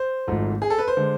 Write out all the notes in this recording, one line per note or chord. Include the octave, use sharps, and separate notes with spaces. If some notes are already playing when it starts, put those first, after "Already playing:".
Already playing: C5
G#1 G#2 F3 A3
G#4
A4
B4
C5
D3 G#3